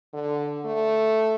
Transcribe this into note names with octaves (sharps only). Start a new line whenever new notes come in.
D3
A3